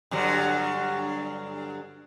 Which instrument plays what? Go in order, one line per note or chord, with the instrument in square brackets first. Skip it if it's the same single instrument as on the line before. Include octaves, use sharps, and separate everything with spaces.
[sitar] G2 D3 F#3